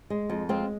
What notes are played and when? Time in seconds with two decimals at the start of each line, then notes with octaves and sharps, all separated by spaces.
0.10 G#3
0.30 F2
0.49 G#3 C4 F4